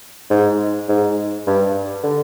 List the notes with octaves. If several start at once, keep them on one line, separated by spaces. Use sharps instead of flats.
G#2
G#2
G2
D3